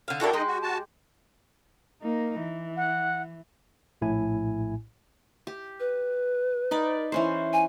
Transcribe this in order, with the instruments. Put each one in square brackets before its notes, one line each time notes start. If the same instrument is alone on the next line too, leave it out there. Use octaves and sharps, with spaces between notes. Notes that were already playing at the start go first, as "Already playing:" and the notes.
[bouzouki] D3 F5
[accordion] D4 E4 A4 [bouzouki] F#4 G4 A#4
[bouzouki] G#3 G4 [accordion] D#4 D#5
[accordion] F#4
F#4 A5
[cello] A#3 D#4
E3
[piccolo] F#5
[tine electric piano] A#1 A2 E4 G#5
[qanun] G4
[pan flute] B4
[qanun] D#4 D5 B5
E3 C#4 C5
[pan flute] G#5